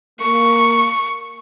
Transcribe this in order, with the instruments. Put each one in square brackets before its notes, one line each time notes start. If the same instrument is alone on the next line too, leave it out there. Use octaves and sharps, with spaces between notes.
[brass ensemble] A#3 [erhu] C#6